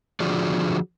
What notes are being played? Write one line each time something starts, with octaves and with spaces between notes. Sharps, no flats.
D3 F3 F4 F#4 G#4 D5